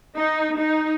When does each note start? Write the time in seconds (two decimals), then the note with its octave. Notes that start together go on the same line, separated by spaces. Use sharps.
0.17 D#4
0.59 D#4